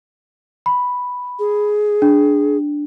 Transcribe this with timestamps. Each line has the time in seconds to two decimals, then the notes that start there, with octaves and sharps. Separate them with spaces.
0.66 B5
1.39 G#4
2.02 D4